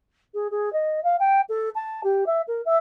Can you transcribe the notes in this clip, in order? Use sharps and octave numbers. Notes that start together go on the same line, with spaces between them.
G#4
G#4
D#5
F5
G5
A4
A5
G4
E5
A#4
E5